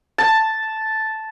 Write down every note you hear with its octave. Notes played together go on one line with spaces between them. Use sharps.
A5